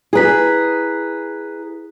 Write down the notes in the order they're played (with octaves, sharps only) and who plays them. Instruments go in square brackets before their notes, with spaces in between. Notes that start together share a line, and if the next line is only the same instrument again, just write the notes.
[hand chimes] E4 A#5 B6 [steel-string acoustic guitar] G#4 B4